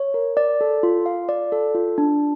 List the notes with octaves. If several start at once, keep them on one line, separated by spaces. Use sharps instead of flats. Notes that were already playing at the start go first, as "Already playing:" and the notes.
Already playing: C#5
A#4
D5
A4
F4
F5
D5
A4
F4
D4